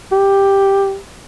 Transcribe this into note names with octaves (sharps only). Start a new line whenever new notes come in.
G4